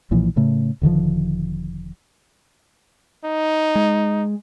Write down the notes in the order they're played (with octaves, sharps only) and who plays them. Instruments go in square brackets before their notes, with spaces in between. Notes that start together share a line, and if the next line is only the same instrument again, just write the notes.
[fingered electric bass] B1 A#2 E3 F3
A2 C#3 A3
E1 D3 D#3 F3
[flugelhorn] D#4
[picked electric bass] G#3